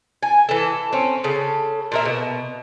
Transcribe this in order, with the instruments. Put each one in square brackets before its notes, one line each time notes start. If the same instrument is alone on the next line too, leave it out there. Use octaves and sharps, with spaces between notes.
[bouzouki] G#5
E3 A4
C4 C#4
C#3 A4
A#2 A#4 E5
B2